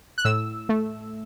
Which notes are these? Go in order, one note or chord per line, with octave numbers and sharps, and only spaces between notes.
F#6
A2 E6
A3